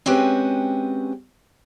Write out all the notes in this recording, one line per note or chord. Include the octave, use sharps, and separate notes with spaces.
G#3 C4 C#4 F#4 G4 B4